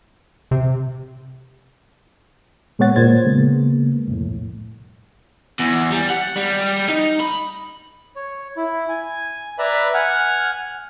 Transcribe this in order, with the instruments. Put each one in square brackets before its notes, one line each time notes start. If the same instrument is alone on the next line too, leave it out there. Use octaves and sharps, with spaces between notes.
[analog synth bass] C3
[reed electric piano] A#2 G#3 B3 C#5 F#5 A6
A#2 C5 G#6 A6
C#3 G#3 A#3 B3
C2 F2 A2
[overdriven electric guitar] E2
G3
F#5
G3
D#4
B5
[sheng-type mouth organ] C#5
E4
G#5
B4 D5 E5 A#5 B5
F#5 G#5 F6